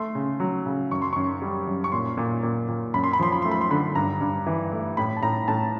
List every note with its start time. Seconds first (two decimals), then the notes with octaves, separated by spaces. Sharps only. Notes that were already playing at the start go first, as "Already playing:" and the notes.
Already playing: A3 C6
0.15 C#3
0.40 F#3
0.66 C#3
0.91 F#2 C#6
1.02 C6
1.13 F#2 C#6
1.42 G3
1.67 F#2
1.84 C#6
1.92 A#2 C6
2.17 A#2
2.43 A#2
2.68 A#2
2.94 F#2 B5
3.04 C6
3.13 B5
3.19 F3 C6
3.32 B5
3.42 A3 C6
3.51 B5
3.61 C6
3.71 D3 B5
3.95 G2 A#5
4.21 G2
4.47 E3
4.72 A3
4.97 A2 B5
5.16 A5
5.23 A2 A#5
5.48 A2 A5